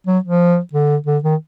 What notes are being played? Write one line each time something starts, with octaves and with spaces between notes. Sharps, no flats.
F#3
F3
D3
D3
D#3